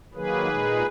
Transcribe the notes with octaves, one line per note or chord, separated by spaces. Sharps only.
D#3 F#3 A#3 G#4 B4
A#2 G#3 D#4